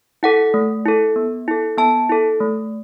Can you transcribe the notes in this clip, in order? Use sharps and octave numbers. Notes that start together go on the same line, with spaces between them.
E4 A4 F#5
A3
E4 A4
B3
E4 A4
B3 A5
E4 A4
A3